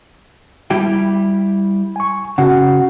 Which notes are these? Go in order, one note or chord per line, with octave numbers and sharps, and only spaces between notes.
G3 E4 G4
G#5 C#6
C#3 F#4 F#5